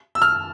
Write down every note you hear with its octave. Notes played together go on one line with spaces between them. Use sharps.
E6
F6